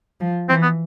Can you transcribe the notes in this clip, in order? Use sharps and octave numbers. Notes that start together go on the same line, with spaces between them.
F3
E3 C4
B3